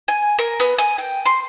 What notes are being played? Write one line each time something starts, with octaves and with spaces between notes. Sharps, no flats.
G#5
A#4
B3
G#5
G5
C6